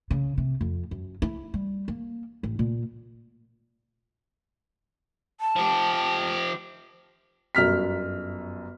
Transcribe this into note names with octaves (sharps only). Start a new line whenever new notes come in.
C#3
C3
F2
F#2
E4
G3
A#3
A1
A#2
A5
F3 G4
G1 F#2 F6 B6